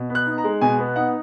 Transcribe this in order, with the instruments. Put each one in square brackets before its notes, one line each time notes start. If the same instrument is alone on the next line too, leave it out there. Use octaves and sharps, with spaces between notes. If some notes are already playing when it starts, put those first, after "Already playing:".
Already playing: [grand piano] B2
B3
F#6
D#4
A#5
G#3
B2 G#5
B3
D#4 F#5